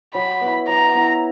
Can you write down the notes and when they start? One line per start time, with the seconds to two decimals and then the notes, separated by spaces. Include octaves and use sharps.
0.14 F#3 B5
0.41 B3 E4
0.68 F#3 A#5
0.95 B3 E4